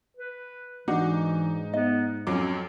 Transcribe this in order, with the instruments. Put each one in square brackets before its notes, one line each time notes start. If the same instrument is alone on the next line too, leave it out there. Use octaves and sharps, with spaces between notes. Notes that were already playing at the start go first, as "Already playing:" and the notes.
[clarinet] B4
[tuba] G#2 [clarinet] E3 [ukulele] D4 F#4 [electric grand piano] D#4
[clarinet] B3 [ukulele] D#5
[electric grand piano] F2 F#3 D6 [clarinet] C#4